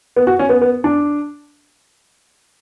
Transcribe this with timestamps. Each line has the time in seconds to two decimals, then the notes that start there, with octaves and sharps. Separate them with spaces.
0.16 B3
0.27 F#4
0.39 C#4
0.49 B3
0.62 B3
0.84 D4